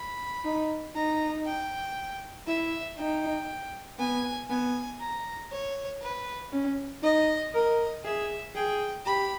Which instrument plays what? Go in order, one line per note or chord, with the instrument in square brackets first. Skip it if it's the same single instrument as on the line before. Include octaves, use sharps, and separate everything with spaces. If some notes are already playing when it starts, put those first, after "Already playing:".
Already playing: [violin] B5
[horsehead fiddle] D#4
[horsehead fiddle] D#4 [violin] A#5
[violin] G5
[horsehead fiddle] E4 [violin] E5
[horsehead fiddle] D#4 [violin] G5
[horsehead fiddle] B3 [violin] G#5
[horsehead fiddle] B3 [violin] G#5
[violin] A#5
C#5
B4
[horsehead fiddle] C#4
[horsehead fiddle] D#4 [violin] D#5
[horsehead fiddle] A#4 [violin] D#5
[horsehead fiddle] G#4 [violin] E5
[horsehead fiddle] G#4 [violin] G5
[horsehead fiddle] G4 [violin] B5